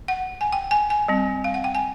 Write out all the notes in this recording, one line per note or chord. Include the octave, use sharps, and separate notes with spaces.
F#5
G#5
G5
G#5
G#5
G3 C4
F5
F#5
G5
G#5